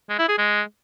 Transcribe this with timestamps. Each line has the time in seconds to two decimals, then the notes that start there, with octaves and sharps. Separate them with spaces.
0.09 G#3
0.19 E4
0.28 G#4
0.38 G#3